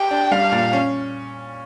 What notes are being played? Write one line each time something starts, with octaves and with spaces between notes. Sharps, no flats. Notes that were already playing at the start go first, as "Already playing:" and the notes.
Already playing: G4 G5
D4
G3 F5
A#2
C#4